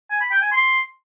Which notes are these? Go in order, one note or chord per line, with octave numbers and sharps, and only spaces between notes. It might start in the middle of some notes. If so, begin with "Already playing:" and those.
G#5
B5
G5
G#5
C6